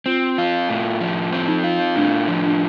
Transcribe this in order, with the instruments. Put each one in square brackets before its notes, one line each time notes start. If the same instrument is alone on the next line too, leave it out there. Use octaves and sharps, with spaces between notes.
[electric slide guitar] C4 [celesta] F4
[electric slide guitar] F4
A2
F3
C4
[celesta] D#4
[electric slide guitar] F4
[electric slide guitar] A2 [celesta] D4
[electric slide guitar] F3
[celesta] D4